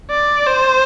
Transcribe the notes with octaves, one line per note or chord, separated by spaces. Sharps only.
D5
C5